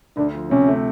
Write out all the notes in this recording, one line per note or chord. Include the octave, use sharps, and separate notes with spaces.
D2 D4
F3
C3 C#4
A3